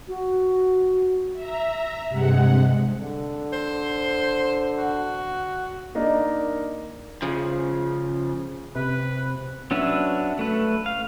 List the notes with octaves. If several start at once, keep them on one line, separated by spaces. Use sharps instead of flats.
F#4
E5 A#5
G2 C3 G#3 F#5
D3
C5
F#4
A#3 D4 D#4 A#4
C#3 F3
C3 B4
F#3 C#4 D4 B4 E5
A3 B4
F5